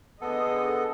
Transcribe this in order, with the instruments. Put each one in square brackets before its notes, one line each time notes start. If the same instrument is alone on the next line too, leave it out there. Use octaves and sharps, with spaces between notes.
[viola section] D3 G#4 D#5 [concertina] B3 A4